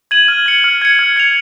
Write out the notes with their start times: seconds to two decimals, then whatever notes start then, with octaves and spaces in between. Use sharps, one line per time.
0.11 G#6 D#7 F#7
0.28 F6
0.46 G#6 C#7
0.64 F6
0.82 G#6 C#7
0.99 F6
1.16 G#6 C#7 F7